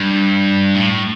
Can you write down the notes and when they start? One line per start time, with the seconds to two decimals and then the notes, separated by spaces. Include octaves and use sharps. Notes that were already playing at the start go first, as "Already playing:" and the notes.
Already playing: G2
0.75 A2